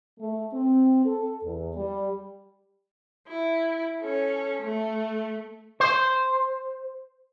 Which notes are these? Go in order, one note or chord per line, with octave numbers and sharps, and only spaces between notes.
A3
C4
A4
E2
G3
E4
C#4 A4
A3
C5